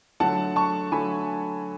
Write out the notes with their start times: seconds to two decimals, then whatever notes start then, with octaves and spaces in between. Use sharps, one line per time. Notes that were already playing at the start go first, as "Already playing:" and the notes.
0.20 D3 F#3 A3 F#5 A5
0.56 A5 C#6
0.92 D3 F#3 A3 G#5 B5